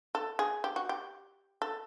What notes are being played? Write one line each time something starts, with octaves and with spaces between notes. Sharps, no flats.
A4
G#4
G4
F#4
G4
A4